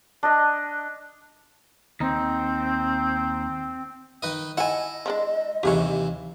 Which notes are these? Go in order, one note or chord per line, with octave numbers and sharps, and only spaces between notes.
D4 D#5
D#2 C4 D#4
D#3 B4 D#5
E4 D#5 F#5 G#5 A5
F3 G#3 D4
D#2 C3 E3 G4 G#4 C#5